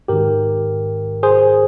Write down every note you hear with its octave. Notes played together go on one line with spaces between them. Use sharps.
G#2 D#3 G4 A#4
G#4 C5